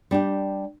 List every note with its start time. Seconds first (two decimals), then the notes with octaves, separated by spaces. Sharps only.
0.11 G3 D4 G4